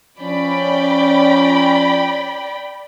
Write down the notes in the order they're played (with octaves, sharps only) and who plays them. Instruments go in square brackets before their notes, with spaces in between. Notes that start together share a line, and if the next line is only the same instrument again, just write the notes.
[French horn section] F3 C#4 [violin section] D5 G5 B5